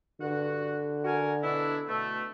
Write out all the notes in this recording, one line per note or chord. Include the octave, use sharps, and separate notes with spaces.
G2 D3 F#4 F#5
F#4 A#4 G#5
B2 D4 E4
B2 A3